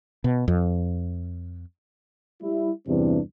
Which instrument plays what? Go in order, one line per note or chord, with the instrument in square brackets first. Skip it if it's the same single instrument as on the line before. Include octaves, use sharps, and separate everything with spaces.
[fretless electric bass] B2
F2
[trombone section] G3 E4
E2 G2 C3 E3 C4 D4